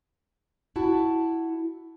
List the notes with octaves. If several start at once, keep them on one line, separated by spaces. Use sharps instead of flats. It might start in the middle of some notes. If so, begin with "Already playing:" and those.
E4 F#4 A5